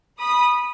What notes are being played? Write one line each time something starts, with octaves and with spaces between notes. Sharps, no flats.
B5 D#6